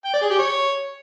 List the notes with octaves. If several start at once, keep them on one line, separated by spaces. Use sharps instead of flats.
G5
D5
G#4
G4
C#5